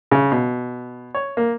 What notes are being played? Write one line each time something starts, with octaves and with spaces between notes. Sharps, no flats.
C#3
B2
C#5
A#3